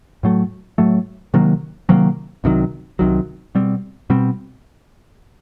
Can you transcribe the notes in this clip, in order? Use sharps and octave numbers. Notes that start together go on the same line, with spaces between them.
A2 F#3 A3
A2 F#3 A3
C3 D#3 F#3 A#3
C3 D#3 F#3 A#3
C2 C3 D#3 F#3
C2 C3 D#3 F#3
B2 G3 C4
B2 G3 C4